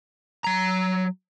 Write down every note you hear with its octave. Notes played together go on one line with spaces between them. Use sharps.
F#3 A#5